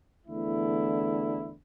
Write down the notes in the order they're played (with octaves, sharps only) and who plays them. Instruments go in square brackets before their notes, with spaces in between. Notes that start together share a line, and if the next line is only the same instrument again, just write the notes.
[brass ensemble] E2 D3 A3 E4